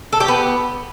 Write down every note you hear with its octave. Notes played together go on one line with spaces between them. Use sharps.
A4
G4
B3